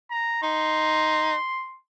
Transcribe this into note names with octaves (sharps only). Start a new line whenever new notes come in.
A#5
D#4 C6